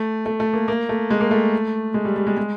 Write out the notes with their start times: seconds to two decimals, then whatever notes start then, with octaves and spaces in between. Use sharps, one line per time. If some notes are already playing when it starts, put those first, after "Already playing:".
Already playing: A3
0.26 A3
0.40 A3
0.54 A#3
0.68 A#3
0.89 A3
1.10 G#3
1.21 A#3
1.31 A3
1.94 G#3
2.05 G3
2.16 G3
2.27 G#3
2.37 G#3